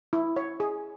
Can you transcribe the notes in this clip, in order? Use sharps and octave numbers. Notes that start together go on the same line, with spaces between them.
E4
C#5
G#4